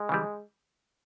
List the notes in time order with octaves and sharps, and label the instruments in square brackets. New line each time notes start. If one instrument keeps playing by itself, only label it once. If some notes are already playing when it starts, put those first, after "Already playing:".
Already playing: [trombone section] G#3
[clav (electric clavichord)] C#3 E3 G3